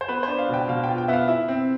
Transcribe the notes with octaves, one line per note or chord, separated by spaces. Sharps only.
C5
B3 B4
C5
D4
F5
B2
G5
B2 F5
G5
F4
G5
B3 E5 F5
E4 E5
C4